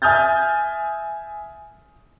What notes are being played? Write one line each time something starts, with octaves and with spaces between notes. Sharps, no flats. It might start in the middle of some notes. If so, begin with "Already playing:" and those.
E5 G#5 D#6 F6 G6 A6